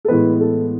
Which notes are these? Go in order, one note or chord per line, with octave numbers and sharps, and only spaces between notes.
A4
A2 E3 G#3 B3 B4
A4